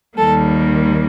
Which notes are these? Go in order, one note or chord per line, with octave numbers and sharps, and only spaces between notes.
D#2 D#3 G3 A#3 A4